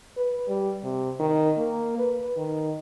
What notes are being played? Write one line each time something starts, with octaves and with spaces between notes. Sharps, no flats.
B4
G3
C3
D#3
A#3
B4
D#3